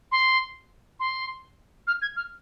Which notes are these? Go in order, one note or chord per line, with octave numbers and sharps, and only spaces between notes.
C6
C6
F6
G#6
F6